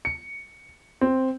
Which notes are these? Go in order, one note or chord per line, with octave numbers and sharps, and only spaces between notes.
C#7
C4